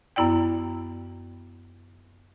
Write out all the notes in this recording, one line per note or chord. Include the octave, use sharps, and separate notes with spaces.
F#2 B3 E4 D5 G5